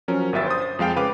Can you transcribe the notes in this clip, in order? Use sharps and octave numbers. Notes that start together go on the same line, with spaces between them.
F3 F#3 C#4 A#4
G1 G2 E5 A6
C5 D#6
F2 G#3 F5 G5
C#3 B4 F5 D6